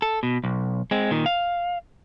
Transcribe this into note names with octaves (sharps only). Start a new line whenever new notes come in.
A4
B2
B1
G#3 C4
A#2 D#3
F5